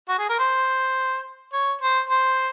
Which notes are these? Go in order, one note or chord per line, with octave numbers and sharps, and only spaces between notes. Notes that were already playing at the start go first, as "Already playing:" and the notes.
F#4
G#4
A#4
C5
C#5
C5
C5